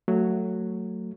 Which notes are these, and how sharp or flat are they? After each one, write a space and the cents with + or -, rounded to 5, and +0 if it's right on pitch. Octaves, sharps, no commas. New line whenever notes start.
F#3 +0 A3 +20